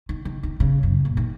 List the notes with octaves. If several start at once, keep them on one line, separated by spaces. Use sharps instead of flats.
D#3
D#3
D#3
C#3
F#2
A#2
D#3